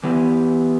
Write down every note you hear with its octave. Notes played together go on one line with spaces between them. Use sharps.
E3 B3 G4 B4